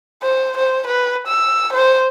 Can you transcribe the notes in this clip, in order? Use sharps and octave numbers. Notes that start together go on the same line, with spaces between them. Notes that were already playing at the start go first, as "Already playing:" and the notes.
C5
C5
B4
E6
C5